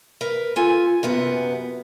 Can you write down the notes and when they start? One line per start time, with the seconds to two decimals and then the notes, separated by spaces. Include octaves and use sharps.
0.21 A#4 B4
0.56 F4 A4 G#5
1.03 F#2 C3 B3